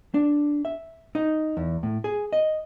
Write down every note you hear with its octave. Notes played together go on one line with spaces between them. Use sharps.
D4
E5
D#4
E2
A2
G#4
D#5